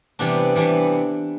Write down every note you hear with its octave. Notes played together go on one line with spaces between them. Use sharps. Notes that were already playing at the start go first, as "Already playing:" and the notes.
C3 E3 G3 B3 D4
C3 E3 G3 B3 D4